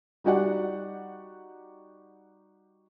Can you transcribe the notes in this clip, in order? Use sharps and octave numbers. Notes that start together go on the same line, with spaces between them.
G3 D#4 F#4 G4 D5 F#5